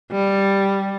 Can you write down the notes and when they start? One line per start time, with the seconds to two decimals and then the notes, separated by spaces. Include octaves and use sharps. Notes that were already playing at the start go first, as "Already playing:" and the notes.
0.12 G3